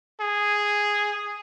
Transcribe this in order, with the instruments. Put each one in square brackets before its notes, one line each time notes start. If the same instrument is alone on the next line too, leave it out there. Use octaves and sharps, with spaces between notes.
[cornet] G#4